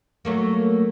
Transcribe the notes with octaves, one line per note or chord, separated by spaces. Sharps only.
F#3 A3 A#3